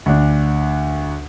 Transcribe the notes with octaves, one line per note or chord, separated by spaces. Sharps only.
D2 D4